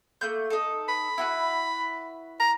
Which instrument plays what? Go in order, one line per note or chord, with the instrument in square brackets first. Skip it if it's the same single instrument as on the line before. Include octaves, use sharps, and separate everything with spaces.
[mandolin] A3 A#3 G6
D#4 A4
[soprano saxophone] B5
[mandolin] E4 F#4 B4
[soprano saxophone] A#5